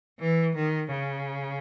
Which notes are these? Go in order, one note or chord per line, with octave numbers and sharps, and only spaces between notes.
E3
D#3
C#3